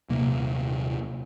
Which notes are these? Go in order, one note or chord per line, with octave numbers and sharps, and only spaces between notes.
D#1 C3 A#3